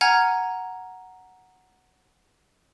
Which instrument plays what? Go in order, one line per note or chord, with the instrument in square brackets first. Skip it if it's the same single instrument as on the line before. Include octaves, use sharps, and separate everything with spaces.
[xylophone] F#5 G#5 A#5 F6 G#6